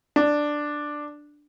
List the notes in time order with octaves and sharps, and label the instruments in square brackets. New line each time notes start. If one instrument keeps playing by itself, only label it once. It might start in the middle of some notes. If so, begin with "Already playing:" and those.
[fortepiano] D4